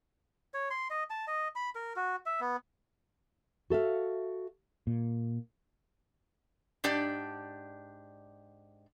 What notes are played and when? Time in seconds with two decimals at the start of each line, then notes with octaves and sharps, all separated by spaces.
0.54 C#5
0.71 C6
0.90 D#5
1.10 A5
1.27 D#5
1.56 B5
1.75 A#4
1.96 F#4
2.26 E5
2.40 B3
3.70 F#4 A4 E5 F5
4.87 A#2
6.84 G#2 D4 G4 D5